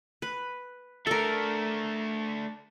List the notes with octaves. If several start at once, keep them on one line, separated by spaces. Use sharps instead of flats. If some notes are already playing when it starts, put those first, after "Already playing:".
B4
A3 D4 A4 A#4